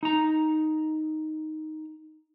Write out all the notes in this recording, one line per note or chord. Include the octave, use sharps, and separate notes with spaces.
D#4 A#5